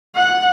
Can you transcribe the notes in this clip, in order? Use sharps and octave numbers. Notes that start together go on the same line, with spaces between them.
F#5